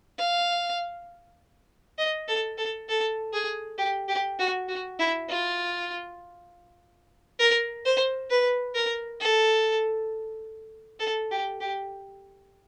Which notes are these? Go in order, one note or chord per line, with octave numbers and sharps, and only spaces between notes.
F5
D#5
A4
A4
A4
G#4
G4
G4
F#4
F#4
E4
F4
A#4
C5
B4
A#4
A4
A4
G4
G4